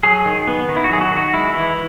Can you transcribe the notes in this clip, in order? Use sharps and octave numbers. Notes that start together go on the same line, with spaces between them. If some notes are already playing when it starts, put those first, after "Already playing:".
F#3 G#4
D#3
B3
D#3
E4
F#4
F#3 G#4
F#4
D#3
F#4
G#3 E4
E3 E4